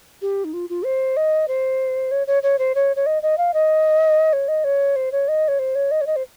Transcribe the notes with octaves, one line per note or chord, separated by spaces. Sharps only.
G4
D#4
F4
F4
C5
D#5
C5
C#5
C#5
C#5
C5
C#5
C#5
D#5
D#5
F5
D#5
C#5
D#5
C#5
C5
C#5
D#5
C#5
C5
C#5
D#5
C#5
D#5
C5